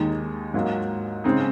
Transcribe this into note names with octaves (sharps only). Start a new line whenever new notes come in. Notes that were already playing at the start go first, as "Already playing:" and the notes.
Already playing: D#2 D#3 G#3 D#4
G#2 F#3 A#3 F4
C#3 G#3 C4 D#4